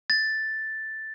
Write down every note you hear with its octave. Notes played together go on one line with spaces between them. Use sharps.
A6